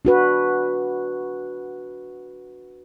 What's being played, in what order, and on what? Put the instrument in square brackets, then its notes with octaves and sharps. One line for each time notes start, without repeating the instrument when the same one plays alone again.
[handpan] D4 F#4 B4